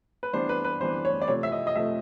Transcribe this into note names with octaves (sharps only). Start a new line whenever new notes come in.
B4
E3 G3 B3 D4 C5
B4
B4
E3 G3 B3 D4 C5
C#5
D5
C3 F3 A3 C4 C#5
E5
D#5
D#5
C3 F3 A3 C4 E5